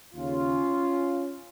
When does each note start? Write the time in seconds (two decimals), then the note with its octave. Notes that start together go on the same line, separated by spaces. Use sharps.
0.14 D#2 C#3 C#4 F4